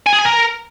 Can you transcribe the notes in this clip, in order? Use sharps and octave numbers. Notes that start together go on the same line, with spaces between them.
G#5
G#4
G#5
A#4